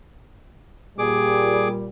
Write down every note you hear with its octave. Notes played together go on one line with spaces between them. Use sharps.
A#2 G3 G#4 D6